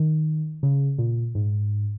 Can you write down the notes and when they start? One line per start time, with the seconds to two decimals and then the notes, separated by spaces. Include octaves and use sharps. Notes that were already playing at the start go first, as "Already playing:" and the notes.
Already playing: D#3
0.63 C#3
0.99 A#2
1.35 G#2